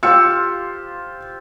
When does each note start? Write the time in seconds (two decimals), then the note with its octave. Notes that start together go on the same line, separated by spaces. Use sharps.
0.03 F4 G4 C5 E6 C#7